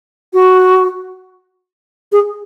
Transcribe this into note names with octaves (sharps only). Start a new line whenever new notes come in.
F#4
G#4